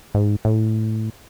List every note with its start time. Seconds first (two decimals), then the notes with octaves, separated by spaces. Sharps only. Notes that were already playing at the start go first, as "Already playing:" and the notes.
0.15 G#2
0.45 A2